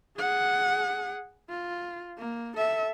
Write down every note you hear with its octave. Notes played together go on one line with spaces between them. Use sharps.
G#4 F#5
F4
A#3
A4 E5